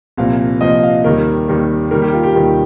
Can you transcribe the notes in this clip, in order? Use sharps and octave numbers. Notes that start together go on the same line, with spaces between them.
C2 A#2 F3 F5
C2 A#2 F3 D#5
F5
D#2 D#3 G3 A#4
D#2 D#3 G3
D#2 D#3 G3 A#4
G4
F4
G4
D#2 D#3 G3